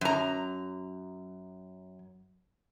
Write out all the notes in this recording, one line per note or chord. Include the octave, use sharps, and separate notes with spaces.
F#2 A#5